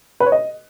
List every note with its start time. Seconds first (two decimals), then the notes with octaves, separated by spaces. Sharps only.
0.20 B4
0.26 C#5
0.32 D#5